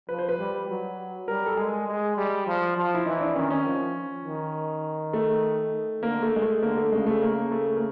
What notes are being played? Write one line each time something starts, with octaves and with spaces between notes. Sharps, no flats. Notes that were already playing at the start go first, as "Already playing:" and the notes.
F3 B4
C5
B4
G3
F#3
G3 A#4
A4
G#3 G#4
G#3
G3
F3
F3
E4
E3 D#4
D4
D#3 C#4
C#4
F3
D#3
A3
D3 A#3
A3
G#3
A3
D3 A#3
A3
C#3 G#3
A3
A#3
A3
A#3